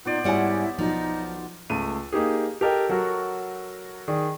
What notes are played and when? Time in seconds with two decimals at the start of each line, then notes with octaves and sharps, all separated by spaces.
0.05 A#2 B3 D#4 C5 D5
0.24 G#2 G3 E4 C#5 F#5 G#5
0.79 B1 F3 D#4
1.70 C#2 A3 D#7
2.13 A#3 D#4 G4 G#4
2.61 G4 A4 A#4 D#5 G5
2.89 F#3 F#4 A4 A#4
4.08 D#3 G#4 D5